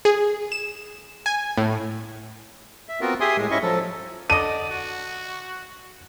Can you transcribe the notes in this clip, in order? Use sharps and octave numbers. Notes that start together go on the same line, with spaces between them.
G#4
E7
G#5
A2
E5
B3 C4 F4 F#4 A#4
G4 G#4 E5 G#5 C6 D#6
A2 G#3
G#2 C#4 E4 D#5 E5 C#6
F3 F#3 A4
D3 D5 D#5 D#7
F#4